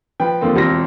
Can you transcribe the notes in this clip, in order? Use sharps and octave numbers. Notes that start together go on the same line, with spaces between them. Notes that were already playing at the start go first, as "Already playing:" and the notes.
F3 B4 G5
D#2 D3 F3 A#3 C4
E1 C4 F4 A#6